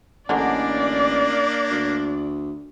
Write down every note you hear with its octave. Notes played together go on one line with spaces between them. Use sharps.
A1 D3 F#3 G#3 A#3 D4 D5
D2